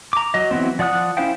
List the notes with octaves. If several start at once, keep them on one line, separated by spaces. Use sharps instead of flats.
A#5 D6
F#3 D#5
E3 F#3 B3 C4
F3 D5 F#5 D#6 F#6
C#4 E4 C5 F5 G5